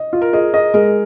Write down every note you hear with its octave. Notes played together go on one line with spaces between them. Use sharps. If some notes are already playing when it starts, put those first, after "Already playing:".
Already playing: D#5
F4
A#4
G#4 D#5
D#5
G#3 A#4